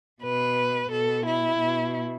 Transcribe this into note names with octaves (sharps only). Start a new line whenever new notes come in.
B2 B4
B2 A4
E4
B2